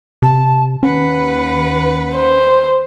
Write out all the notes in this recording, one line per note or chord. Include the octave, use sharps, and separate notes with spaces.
C3 A5
D#2 C#4 B4 F#5
C5